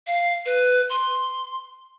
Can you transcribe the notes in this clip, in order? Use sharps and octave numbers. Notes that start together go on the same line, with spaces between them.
F5
B4
C6